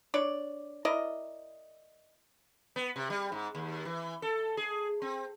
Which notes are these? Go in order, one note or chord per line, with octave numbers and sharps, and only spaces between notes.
D4 C#5 D5
E4 A#4 D5 D#5
B3
C3
G3
G#2
D#2
E3
A4
G#4
C4